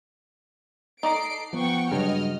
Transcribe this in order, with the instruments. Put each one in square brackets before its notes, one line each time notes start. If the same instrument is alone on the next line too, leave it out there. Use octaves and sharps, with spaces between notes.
[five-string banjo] D#4 D5 A#5 [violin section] A4 C7 D7
[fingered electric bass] F3 B3 [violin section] F#5 G5 C#6
[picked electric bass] G2 [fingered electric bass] C#3 F#3 G#3 [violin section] D#5 F6